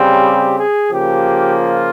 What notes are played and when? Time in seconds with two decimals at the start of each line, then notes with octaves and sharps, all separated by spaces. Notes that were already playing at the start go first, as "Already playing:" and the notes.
Already playing: C#3 G3 C4
0.21 G4
0.57 G#4
0.91 C#3 F3 A#3 G4
1.61 F4